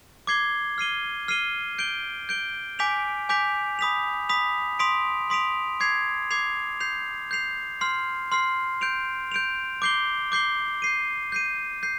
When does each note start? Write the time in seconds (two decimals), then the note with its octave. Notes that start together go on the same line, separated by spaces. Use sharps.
0.27 D6 G#6 C7 G7
0.78 F6 C7 D#7 G7
1.28 F6 C7 D#7 G7
1.79 G6 D7 G7
2.29 G6 D7 G7
2.79 G#5 D6 G6 B6 F7
3.29 G#5 D6 G6 B6 F7
3.79 B5 D#6 B6 F7
4.29 B5 D#6 B6 F7
4.79 C6 D#6 B6 D7 F7
5.30 C6 D#6 B6 D7 F7
5.80 D6 G#6 C7 F7
6.31 D6 G#6 C7 F7
6.80 G6 C7 F7
7.31 G6 C7 F7
7.81 C6 F6 C7
8.32 C6 F6 C7
8.81 G6 D7 F7
9.32 G6 D7 F7
9.82 D6 G6 C7 G7
10.32 D6 G6 C7 G7
10.82 G6 C7 D#7
11.32 G6 C7 D#7
11.83 G6 C7